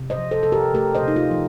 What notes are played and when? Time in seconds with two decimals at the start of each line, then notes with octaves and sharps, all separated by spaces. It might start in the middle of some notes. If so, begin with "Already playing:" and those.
Already playing: C3
0.10 C5 D#5
0.18 F3
0.31 A4 C5
0.43 C3 A4
0.52 G4 A#4
0.74 A3 G4 A#4
0.95 C5 D#5
1.03 C3
1.08 D#4
1.16 F4
1.31 F3